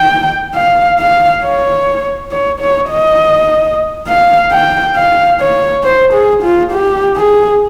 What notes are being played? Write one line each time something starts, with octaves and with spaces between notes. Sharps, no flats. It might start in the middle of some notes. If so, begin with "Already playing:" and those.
Already playing: G5
F5
F5
C#5
C#5
C#5
D#5
F5
G5
F5
C#5
C5
G#4
F4
G4
G#4